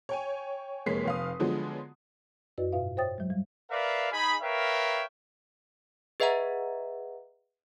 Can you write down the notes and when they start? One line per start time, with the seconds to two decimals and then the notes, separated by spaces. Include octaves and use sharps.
0.09 C#5 G5 G#5
0.86 F1 G#3 A#3 C#5 B6 C7
1.05 F1 F5 D#6
1.40 D3 F3 F#3 G#3 B3
2.58 F#2 F#4 B4 D5 D#5
2.73 G#2 B2 F4 B4 E5 F5
2.97 C5 C#5 E5 G5 D#6 A6
3.18 F#3 G#3
3.30 G3
3.71 A#4 B4 D5 E5 F5
4.12 D#4 G#4 B5
4.43 A#4 B4 C#5 E5 F5 G5
6.20 G#4 B4 D#5 E5 F#5 A#5